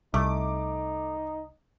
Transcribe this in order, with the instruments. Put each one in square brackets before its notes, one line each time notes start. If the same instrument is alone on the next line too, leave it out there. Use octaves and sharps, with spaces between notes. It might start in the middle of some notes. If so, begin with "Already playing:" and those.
[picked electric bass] C2 [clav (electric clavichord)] A3 [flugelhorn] D#4 [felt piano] D6